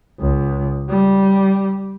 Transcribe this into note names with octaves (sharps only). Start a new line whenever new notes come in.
C#2
G3